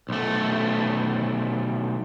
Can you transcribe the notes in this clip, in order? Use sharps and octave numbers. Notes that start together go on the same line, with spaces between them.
B1 A3